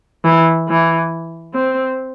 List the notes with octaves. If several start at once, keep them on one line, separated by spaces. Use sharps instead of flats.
E3
E3
C4